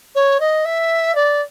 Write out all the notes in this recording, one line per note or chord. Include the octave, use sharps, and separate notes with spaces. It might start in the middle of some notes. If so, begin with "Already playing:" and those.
C#5
D#5
E5
D5